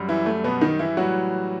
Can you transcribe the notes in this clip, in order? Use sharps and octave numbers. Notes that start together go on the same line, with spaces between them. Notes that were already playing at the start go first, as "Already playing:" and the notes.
Already playing: F#2 G3
E3 E4
A3
B2 B3
D#3 D#4
E3 E4
A2 E3 F#3 G3 F#4